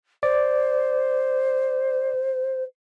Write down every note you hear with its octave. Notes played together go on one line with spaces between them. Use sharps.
C5 D5